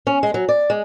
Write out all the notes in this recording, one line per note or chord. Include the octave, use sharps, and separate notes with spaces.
C#4
G#3
F#3
D5
G#3